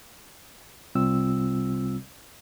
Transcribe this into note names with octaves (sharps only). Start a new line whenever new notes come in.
C2 C3 G3 C4 F4 E6